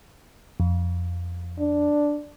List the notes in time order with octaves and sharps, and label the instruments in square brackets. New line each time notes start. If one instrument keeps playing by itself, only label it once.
[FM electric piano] F2
[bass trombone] D4